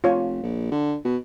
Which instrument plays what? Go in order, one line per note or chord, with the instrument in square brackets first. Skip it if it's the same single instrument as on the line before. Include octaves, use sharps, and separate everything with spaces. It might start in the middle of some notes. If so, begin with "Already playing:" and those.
[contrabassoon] F1 [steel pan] F4 C#5
[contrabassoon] A#1
D3
B2